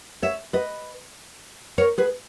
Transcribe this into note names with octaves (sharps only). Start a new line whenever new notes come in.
C#5 E5
B4 D#5
A#4 C#5
G#4 B4